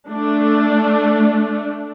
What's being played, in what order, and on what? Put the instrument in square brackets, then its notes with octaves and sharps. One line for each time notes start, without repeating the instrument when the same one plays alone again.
[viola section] A3 D4